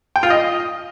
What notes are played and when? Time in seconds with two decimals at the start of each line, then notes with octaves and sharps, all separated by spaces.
0.16 G5
0.23 F4
0.30 D#5